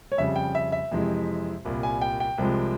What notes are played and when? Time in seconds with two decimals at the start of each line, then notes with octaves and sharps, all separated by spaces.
0.12 C#5
0.17 F2 C#3 G3 E5
0.36 G5
0.55 E5
0.72 E5
0.91 F2 C3 E3 G#3
1.65 C2 A#2 G3
1.83 G#5
2.01 G5
2.20 G5
2.38 C2 C3 F3 G#3